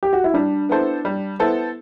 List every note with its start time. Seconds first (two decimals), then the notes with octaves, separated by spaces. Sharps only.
0.03 G4
0.13 F#4
0.24 E4
0.34 G3 D4
0.69 B3 E4 A4 C5
1.05 G3
1.39 B3 E4 A4 C5